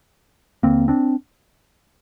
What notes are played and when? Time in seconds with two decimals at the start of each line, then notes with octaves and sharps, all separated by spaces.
0.63 D#2 D3 A#3 C4
0.88 C4 D4